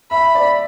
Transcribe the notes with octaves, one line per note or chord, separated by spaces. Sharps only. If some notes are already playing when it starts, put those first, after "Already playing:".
E5 B5
D5